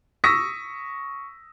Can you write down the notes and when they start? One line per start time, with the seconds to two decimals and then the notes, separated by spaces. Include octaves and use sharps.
0.24 C#6 D#6 E6 A#6 B6